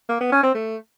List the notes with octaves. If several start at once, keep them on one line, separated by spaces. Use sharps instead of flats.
A#3
B3
C#4
C4
A3